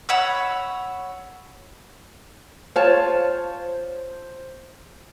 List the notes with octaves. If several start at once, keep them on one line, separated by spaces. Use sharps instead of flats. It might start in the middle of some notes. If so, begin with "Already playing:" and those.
C#5 F#5 B5 E6
F4 C5 C#5 A5